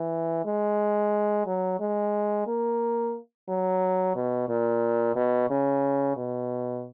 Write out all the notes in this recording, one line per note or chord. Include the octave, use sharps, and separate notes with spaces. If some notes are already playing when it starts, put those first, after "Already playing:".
Already playing: E3
G#3
F#3
G#3
A#3
F#3
B2
A#2
B2
C#3
B2